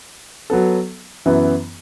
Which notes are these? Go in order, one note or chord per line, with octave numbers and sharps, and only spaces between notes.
F#3 B3 A4
F#2 E3 B3